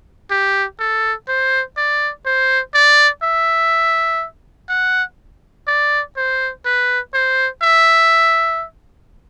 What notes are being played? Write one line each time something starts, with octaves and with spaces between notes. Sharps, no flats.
G4
A4
C5
D5
C5
D5
E5
F#5
D5
C5
B4
C5
E5